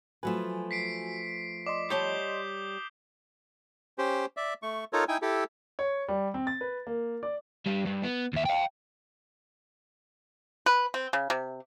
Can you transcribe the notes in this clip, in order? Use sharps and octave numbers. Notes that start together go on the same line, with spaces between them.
F3 F#3 A3 F#4 B4 G#5
B6 C7 D7
D5 D#5 C6 D6
G3 C#5 A5 D#6 G6 G7
C#4 G4 C5
D5 E5
A3 C#6
D#4 F4 A4 A#4 C#5
D#4 E4 G5 G#5
E4 G4 A4
C#5
G3
C4
A6
B4
A#3
D5
G2 G3
G2
B3
D#2 E5
F5 G5
B4
C4
C#3
C3